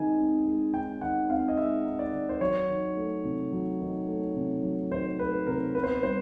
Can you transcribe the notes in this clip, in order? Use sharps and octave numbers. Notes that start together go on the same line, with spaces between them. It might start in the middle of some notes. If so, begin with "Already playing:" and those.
Already playing: D#3 G#3 C4 D#4 G#5
C4
G#3
D#4 G5
D#3 F#5
C4 F5
D#5
G#3 E5
D#4
D5
D#3
C5
F#3 C#5
D#3
A3
C3
F#3
D#3
A3
C3
F#3
D#3 C5
A3 B4
C3 A#4
B3 B4
C5
B4
G3 C5